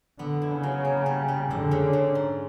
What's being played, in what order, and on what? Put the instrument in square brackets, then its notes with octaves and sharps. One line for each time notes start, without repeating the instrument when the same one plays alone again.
[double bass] D3 [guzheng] B3
[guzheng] E4
[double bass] C#3
[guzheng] F#3
A#3
G3
G3
[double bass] D3 [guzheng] G#3
[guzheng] C#3
C#3
G#2